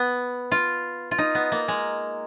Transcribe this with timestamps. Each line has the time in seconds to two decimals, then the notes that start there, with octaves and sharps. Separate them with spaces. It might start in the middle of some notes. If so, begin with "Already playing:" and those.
Already playing: B3
0.51 F4
1.11 F4
1.18 D#4
1.35 B3
1.52 A#3
1.68 G#3